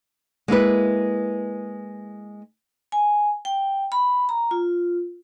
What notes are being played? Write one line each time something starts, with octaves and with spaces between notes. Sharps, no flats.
G#3 A#3 E4 B4
G#5
G5
B5
A#5
F4